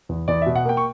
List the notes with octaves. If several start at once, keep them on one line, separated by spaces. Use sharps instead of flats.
E2
E2 D5
B2 E5
F#5
A#3 G5
C#6